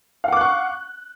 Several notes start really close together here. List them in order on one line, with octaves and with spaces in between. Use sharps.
F5 F#5 D6 F#6 C#6